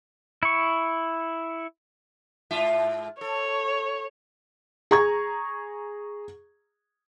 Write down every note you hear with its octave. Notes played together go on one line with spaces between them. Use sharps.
E4 C#6
G#2 F4 E5
A4 C#5
G#4 A#5 C#6 G#6